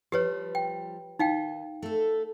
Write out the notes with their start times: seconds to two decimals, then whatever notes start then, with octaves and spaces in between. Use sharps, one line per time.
0.12 F3 G3 G4 B4 C#5
0.55 G5
1.19 D#3 D#4 F5 G5
1.82 A3 A4